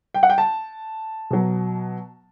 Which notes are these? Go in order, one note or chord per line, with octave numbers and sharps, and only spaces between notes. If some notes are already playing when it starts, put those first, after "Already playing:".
G5
F#5
G5
A5
B2 F#3